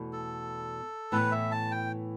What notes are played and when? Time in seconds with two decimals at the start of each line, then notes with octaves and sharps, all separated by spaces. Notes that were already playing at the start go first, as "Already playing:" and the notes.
Already playing: E2 B2 A3 E4
0.13 A4
1.12 A2 E3 B3 B4
1.32 E5
1.51 A5
1.71 G5